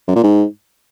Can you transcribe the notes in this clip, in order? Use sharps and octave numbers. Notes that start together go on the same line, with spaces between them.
F#2
A#2
G#2